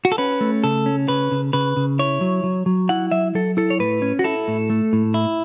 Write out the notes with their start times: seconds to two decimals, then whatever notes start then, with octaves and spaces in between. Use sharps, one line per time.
0.05 F#4
0.12 A4
0.18 C#4 B4
0.41 A3
0.64 C#3 A4
0.86 C#4
1.08 C#3 B4
1.32 C#3
1.53 C#3 B4
1.77 C#3
1.99 E4 C#5
2.21 F#3
2.44 F#3
2.66 F#3
2.89 E4 F#5
3.11 F#3 E5
3.35 F#3 A4
3.57 E4 A4
3.70 C#5
3.79 A2 B4
4.02 C#4
4.19 F#4
4.24 E4 A4
4.48 A2
4.70 A3
4.93 A2
5.14 E4